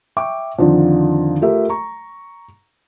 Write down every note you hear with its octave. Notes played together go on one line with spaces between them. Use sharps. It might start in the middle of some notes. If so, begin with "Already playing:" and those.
E5 G5 C#6 D6
F2 D3 D#3 F3 D4
A3 F4 G4 A#4 E5
A#5 C#6